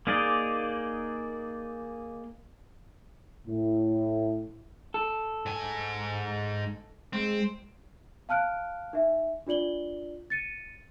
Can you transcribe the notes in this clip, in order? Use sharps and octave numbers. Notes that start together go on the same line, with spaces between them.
A#3 D#4 G#4 D5 D#5
A2
A4
G#2 G#5
G#3 C4
F5 A5 F6 F#6 D7
D#4 E5
D4 F4 D5 F#7 G7
A6 C#7 D#7